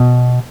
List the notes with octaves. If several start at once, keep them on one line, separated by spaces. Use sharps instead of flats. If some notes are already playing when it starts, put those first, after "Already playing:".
Already playing: B2